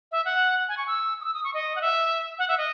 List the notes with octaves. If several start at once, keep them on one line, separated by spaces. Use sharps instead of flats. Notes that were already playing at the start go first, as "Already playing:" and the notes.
E5
F#5
G#5
C#6
E6
D#6
E6
D#6
C#6
D#5
F#5
E5
F#5
E5
D#5